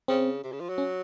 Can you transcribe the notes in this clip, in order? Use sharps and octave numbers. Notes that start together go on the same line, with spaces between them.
C#3 C4
C3
C#3
F3
F#3
C#4